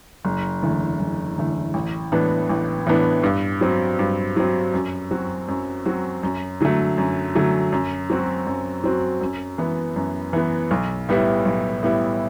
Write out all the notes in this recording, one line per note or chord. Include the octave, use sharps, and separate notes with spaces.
F#1
E2 D3 A3
F#1
E2 D3 A3
A1
A2 E3 B3 D4
A1
A2 E3 B3 D4
G2
F#3 C4
G2
F#3 C4
F#2
F#3 C4 F#4
F#2
F#3 C4 F#4
F#2
D3 F#3 A3
F#2
D3 F#3 A3
F#2
F#3 C4 F#4
F#2
F#3 C4 F#4
F#2
E3 B3
F#2
E3 B3
B1
A2 G3 B3 E4
B1
A2 G3 B3 E4